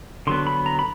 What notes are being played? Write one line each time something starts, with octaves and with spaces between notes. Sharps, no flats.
D3 F#3 B3 C6
B5
A#5
B5